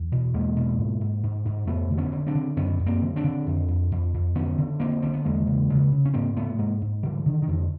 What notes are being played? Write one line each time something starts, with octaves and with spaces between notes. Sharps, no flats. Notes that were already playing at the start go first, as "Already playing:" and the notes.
Already playing: E2
B2
E2 G#3 A#3
B2
G#2
G#2
G#2
G#2
F2 A3 B3
D3
B3 C#4
D3
C4 D4
D3
F#2 B3 C#4
F#2
A#3 C4
D3
C4 D4
D3
F2
F2
F2
F2
D3 B3 C#4
D3
D3 A#3 C4
D3 C4
B3
E2 G#3 A#3
C#3
C#3
C#3
C#4
G#2 A#3 C4
G#2 A3 B3
G#2 G#3 A#3
G#2
D3 F3 G3
D3 D#3
D#3
F2 D3